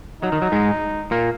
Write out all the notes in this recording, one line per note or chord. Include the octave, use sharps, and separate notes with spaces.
F#3 D#4
D#3
F#3
G#2 G#3
A#2 A#3